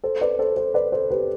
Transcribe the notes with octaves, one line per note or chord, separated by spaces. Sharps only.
A4 C5
B4 D5
A4 C5
A4 C5
B4 D5
A4 C5
G4 B4